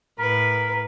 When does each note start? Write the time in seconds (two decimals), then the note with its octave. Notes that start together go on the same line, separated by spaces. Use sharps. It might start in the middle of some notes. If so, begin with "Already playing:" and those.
0.19 A2 A#4 B4 B5